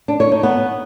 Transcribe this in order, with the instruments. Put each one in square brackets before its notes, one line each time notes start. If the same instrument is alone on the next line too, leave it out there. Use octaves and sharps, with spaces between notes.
[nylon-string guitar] D4
C#5
D#4
B3